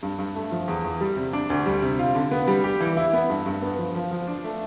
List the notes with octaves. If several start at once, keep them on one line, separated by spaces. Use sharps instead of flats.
G2
G2
A3
F3
E2
E2
G3
C3
D4
D2
G3
C3
F4
D3
B3
G3
G4
E3
E4
B3
G2
G2
B3
F3
F3
F3
D4
A3